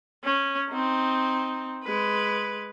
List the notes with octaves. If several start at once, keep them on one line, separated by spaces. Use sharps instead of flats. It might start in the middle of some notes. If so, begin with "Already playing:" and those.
C#4
C4 D#4
G#3 B4